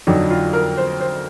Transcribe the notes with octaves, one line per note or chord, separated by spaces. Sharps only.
F2 D3 F#3 D#4
F4
A#4
C5
C5